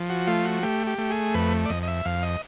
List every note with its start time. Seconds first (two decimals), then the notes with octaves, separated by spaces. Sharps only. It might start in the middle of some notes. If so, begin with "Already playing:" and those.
Already playing: F3
0.09 F#4
0.27 A3 F4
0.45 F#4
0.63 A3 G4
0.87 G4
0.98 A3
1.10 G#4
1.34 F2 B4
1.66 D5
1.70 F2 D#5
1.83 D#5
1.88 E5
2.05 F2 F5
2.23 D#5